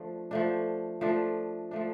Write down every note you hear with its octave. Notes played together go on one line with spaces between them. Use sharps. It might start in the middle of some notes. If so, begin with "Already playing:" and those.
Already playing: F3 A3 D4
F3 A3 D4
F3 A3 D4
F3 A3 D4